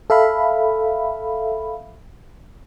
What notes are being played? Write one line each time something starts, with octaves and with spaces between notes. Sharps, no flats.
A4 E5 F5 B5